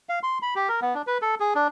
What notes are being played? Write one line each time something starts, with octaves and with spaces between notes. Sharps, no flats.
F5
C6
B5
G4
A#4
B3
D4
B4
A4
G#4
D4